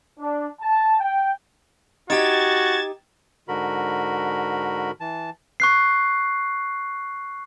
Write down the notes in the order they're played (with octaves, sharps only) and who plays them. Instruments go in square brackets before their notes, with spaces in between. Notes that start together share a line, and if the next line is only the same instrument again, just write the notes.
[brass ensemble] D4
A5
G5
[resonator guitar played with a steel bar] D#4 G4 [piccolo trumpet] F#4 [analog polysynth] G#6 A6 E7
[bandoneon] G#2 D3 F#4 A#4 B5
E3 A5
[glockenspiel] C#6 F#6 C7